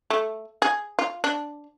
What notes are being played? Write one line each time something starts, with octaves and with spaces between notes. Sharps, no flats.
A3
G#4
F4
D4